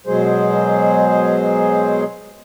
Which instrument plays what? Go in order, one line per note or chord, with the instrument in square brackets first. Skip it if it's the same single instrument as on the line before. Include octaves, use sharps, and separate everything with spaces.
[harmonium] B2 F#3 G#3 G#4 C5